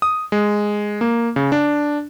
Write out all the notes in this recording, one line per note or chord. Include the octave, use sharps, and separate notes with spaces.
D#6
G#3
A#3
C#3
D4